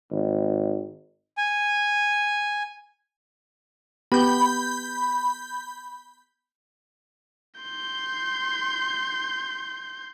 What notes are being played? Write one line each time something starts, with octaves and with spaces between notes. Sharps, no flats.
G#1
G#5
B3 G4 B5 G6
C6 G6